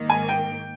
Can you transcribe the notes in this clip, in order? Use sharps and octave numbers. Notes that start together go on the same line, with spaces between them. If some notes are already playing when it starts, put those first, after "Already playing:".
Already playing: G#2 D#3 A#3
G#5
G5